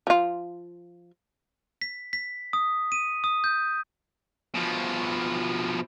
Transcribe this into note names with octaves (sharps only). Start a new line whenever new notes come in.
F3 F4
B6
B6
D#6
D#7
D#6
G6
B2 F3